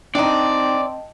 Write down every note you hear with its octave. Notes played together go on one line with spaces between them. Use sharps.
C4 D4 D#4 D5 D#5 G5 A5